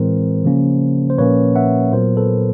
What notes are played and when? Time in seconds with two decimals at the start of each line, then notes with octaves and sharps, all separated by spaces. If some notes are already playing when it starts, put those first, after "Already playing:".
Already playing: A2 E3 G#3 C4 A#4 C5
0.45 C#3 F3 A#3 C#4
1.10 C5
1.18 A#2 F3 A#3 C#4 B4 C#5
1.56 E5 F#5
1.93 A#2 F#3 B3 A#4 C5
2.17 A4 B4